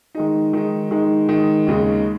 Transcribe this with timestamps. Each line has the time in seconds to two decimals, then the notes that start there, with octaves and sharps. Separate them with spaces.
0.15 D#3 G#3 D#4
0.53 D#3 G#3 D#4
0.91 D#3 G#3 D#4
1.29 D#3 G#3 D#4
1.67 D#2 C#3 G#3 D#4